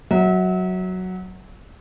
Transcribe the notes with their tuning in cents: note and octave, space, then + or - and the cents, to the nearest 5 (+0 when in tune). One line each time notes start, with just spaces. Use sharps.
F#3 +0 E5 -35